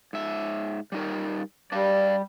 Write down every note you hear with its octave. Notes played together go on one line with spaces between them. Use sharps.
G#2 E5
G3 D#4 A#4
G3 D4 D5 F5